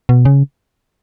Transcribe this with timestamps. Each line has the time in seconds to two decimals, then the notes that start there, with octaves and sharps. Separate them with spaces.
0.09 B2
0.25 C#3